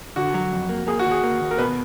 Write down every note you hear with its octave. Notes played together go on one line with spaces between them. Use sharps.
D3 F#4
F#3
F2
A#3
A#3 G#4
F#4
D#2
G#4
A#3
D#2
A#4
B2 B4